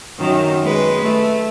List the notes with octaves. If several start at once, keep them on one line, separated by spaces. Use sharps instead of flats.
F#2 D#3
G#3 B4
A3